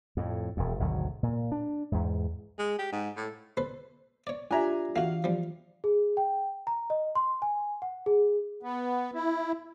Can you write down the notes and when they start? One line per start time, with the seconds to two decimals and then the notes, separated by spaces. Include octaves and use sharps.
0.17 F2 A2
0.57 E1 F2
0.79 G#1 D2 B2 F#3
1.23 A#2
1.52 D4
1.92 E2 G#2
2.59 G#3
2.79 G4
2.92 G#2
3.17 A2
3.57 A4 B4 C5
4.27 C#5 D5
4.51 D4 F4 G4 E5 G#5 A#5
4.96 E3 A3 F#4 F5
5.24 F3 G3
5.84 G#4
6.17 G5
6.67 A#5
6.90 D#5
7.16 C6
7.42 G#5
7.82 F#5
8.06 G#4
8.63 B3
9.14 E4